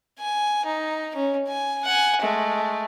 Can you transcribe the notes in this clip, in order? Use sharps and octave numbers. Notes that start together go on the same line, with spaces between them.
G#5
D#4
C#4
G#5
F#5 G#5
G#3 A3